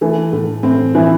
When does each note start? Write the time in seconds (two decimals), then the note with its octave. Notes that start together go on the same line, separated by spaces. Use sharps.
0.01 E3 A3
0.32 A2 A3
0.63 A2 C4
0.95 E3 E4